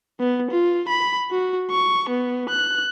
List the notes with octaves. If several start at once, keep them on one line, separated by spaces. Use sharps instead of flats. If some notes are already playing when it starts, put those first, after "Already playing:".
B3
F4
B5
F#4
C#6
B3
F#6